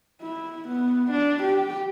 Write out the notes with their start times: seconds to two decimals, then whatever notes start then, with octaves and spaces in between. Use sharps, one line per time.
0.22 E4
0.68 B3
1.11 D4
1.43 G4